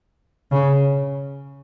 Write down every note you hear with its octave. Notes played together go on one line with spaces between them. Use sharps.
C#3